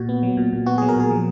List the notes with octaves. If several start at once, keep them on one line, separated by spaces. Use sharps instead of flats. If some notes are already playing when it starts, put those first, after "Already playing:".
Already playing: A#2 F#4
B3
F#3
A#2
A#2
B3 F#4
F#3 G#4
A#4
A#2 G#4
F3